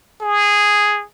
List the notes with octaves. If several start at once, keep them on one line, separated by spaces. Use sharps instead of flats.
G#4